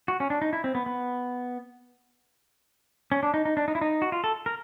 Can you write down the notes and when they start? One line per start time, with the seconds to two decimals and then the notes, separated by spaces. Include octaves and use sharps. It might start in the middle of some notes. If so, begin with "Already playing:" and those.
0.08 F#4
0.20 C#4
0.30 D4
0.42 D#4
0.53 E4
0.64 C4
0.75 B3
0.86 B3
3.12 C#4
3.23 D4
3.34 D#4
3.45 D#4
3.57 D4
3.68 D#4
3.75 E4
3.81 D#4
4.02 F#4
4.12 F4
4.24 A4
4.46 A#4